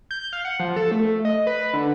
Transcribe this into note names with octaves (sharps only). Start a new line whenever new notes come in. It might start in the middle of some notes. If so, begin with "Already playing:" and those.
G6
F5
F#5
F3
A4
A3
D#5
B4
D3